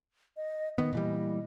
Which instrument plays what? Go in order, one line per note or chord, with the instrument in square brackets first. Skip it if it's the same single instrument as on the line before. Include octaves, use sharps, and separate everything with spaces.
[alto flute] D#5
[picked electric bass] D#3 B3 [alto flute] D#5
[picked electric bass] A#2 E3 G3